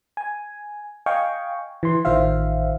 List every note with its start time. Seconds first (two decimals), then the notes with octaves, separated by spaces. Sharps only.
0.17 G#5
1.06 D#5 F5 G5 G#5 C#6
1.83 E3 C6
2.05 A1 D#3 F4 C5 E5 F5